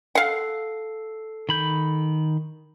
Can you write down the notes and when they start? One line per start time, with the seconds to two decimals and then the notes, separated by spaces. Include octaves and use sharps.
0.15 A4 F5 F#5 C7
1.49 D#3 B5 G6